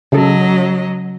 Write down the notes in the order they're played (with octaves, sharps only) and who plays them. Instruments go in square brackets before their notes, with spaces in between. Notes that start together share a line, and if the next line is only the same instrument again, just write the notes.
[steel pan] C#3 A4 [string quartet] F#3 D#5